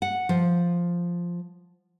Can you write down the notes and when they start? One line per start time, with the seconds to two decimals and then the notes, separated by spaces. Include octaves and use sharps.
0.02 F#5
0.29 F3